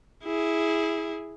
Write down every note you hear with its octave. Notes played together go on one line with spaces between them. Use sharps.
E4 G#4